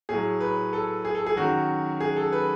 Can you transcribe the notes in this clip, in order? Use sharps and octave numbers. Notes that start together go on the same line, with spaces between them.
A2 F#3 G#4
B4
A4
G#4
A4
G#4
F#2 D#3 F#3 F#4
G#4
A4
B4